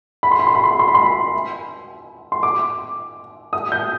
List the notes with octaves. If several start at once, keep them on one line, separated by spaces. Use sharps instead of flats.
B5
C6
B5
C6
B5
C6
B5
C6
B5
C6
B5
C6
D6
D#6
G6